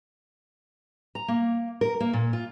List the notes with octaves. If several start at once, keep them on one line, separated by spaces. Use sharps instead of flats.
A#5
A#3
A#4
A#3
A#2
F4